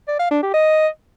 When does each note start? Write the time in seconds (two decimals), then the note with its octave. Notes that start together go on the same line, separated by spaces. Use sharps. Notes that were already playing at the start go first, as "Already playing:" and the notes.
0.08 D5
0.19 F5
0.31 D4
0.42 G4
0.54 D#5